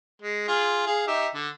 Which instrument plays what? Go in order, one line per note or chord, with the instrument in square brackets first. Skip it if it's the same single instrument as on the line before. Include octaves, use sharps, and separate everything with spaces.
[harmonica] G#3
F4 G#4
G#4 F5
D#4 G4 E5
D3